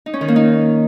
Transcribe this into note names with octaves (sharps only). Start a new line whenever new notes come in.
D#4
C#4
D#3
A#3
D#4